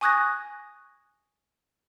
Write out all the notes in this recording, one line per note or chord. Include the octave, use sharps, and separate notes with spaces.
G#5 C#6 D#6 F#6 G#6 A#6